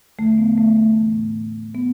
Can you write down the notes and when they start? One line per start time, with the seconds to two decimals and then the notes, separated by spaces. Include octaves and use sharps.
0.18 E2 D3 F3 A3
0.38 B3
0.58 A3
0.76 A3
0.96 A2 E3
1.74 F3 B3